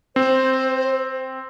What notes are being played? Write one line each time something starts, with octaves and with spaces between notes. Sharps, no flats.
C4 C5